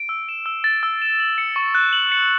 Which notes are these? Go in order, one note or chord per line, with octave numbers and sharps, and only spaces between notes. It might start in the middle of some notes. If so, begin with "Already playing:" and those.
Already playing: D7
E6
E7
E6
A6
E6
E7
F#7
C#7
C#6
F#6
F#7
C#7